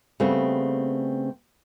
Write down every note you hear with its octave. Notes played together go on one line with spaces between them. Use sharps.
C#3 G3 A3 B3 C4